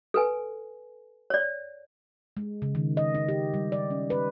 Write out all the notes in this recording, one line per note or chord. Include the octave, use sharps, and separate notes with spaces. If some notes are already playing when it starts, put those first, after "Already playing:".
A4 B4 G#5
C#5 D5
G#3
C#3
D#3
D#5
D#4
G4
G3
D5
C#4
B4